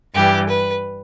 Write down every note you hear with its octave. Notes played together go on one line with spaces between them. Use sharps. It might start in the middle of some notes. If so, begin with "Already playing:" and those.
G2 E3 G3 G4
B4